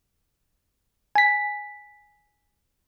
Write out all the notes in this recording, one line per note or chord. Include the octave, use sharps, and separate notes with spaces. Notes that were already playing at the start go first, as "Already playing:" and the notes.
G#5 B6